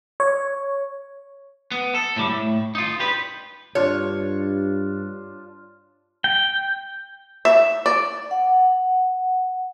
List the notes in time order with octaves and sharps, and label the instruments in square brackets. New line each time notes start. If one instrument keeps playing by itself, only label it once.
[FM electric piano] C#5
[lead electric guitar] B3
A4
A2 G3
A2
D#4 F4
G4 B4
[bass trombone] G2 [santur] D4 F4 [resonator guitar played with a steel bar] C#5
[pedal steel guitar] G5
[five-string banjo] E5
D5
[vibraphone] F#5